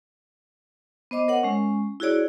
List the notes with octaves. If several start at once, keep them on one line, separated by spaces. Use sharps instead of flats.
B3 C5 D#5 D6
A#4 C#5 F#5
G#3 C#4
E4 F#4 G#4 C#5 D5